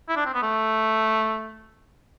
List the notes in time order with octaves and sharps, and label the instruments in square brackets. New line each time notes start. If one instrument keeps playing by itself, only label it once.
[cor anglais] E4
D4
C4
B3
A3